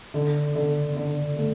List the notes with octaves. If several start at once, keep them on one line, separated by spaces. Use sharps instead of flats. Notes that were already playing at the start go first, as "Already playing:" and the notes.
D3
D3
D3
A3